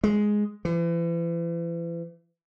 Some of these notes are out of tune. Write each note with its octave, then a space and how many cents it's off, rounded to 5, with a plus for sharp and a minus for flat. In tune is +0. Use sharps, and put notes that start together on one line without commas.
G#3 +5
E3 +40